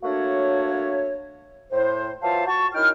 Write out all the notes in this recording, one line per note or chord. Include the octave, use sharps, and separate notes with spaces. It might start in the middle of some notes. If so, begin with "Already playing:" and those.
A3 A#3 D4 F#4 C#5
A2 C5
E3 F#3 F4 C5 F5 A5
F#4 A5 C#6
F#2 D#4 E4 G5 F6